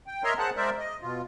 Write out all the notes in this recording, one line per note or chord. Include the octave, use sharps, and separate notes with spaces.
G5
A#4 C#5 D#5 E5 A#5 C6
G#4 C5 F#5 A5 F#6
G#3 A#4 C5 D5 E5
D#5
B2 F4